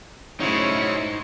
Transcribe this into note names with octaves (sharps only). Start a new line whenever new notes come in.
C#3 F#3 A3 D#4 E4 C5 C#5 C#6